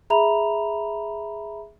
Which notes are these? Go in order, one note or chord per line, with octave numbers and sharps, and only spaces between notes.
G#4 E5 A#5 B5 F7